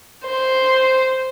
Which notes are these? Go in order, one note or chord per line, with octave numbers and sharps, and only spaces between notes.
C5